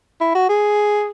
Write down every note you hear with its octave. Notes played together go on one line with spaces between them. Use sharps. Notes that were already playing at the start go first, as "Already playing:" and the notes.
E4
F#4
G#4